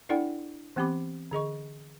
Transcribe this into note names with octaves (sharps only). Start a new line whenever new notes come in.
D4 E4 A4 D5 F#5 G5
E3 B3 C4 G4 B5 D6
D3 G#4 D#5 C#6